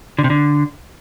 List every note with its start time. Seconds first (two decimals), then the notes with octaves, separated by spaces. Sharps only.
0.19 D3
0.24 C3
0.30 D3